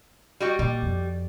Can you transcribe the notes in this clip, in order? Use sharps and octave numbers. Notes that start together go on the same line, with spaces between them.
G3 F#4 D#5
A#2 G3
F2